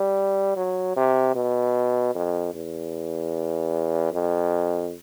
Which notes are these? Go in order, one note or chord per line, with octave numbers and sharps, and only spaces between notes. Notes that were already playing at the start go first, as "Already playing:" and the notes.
Already playing: G3
F#3
C3
B2
F2
E2
F2